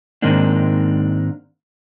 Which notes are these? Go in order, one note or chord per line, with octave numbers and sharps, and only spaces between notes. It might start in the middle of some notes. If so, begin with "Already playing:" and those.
G#2 D#3 G#3 A#3 C4 D4